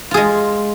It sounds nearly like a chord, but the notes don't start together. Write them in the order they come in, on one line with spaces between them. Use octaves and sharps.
F4 G#4 G#3